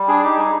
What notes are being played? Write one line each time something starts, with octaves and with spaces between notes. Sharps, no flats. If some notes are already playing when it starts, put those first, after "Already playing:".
Already playing: G3
D4 G#4
D#4 G4
G3 G#4